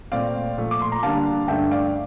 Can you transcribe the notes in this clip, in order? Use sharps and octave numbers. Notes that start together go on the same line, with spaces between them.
A#2 A3 C4 D5 F5
A#2 F3 A3
D6
C6
A#5
D3 G3 A#3 D4 F5 A5
G2 D3 A3 D4 E5 G5
D5 F5